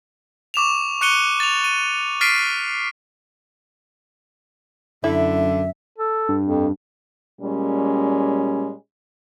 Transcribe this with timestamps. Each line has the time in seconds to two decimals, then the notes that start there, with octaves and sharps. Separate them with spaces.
0.54 C#6 D6 E7 F7
1.01 C#6 F#6 C#7 D#7 G7
1.40 A6 F7
1.64 D#7
2.21 F6 A6 B6 C7 D7 D#7
5.04 F#2 D3 E4 E5
5.98 A4
6.29 G2
6.46 F2
7.41 A#2 G3 G#3 C#4